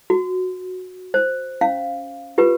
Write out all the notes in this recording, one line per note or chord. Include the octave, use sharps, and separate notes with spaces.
F#4
C5
C#4 F5
F4 G4 B4